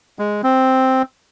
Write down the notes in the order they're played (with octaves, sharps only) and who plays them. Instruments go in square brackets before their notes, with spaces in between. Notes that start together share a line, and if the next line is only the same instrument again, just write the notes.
[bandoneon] G#3
C4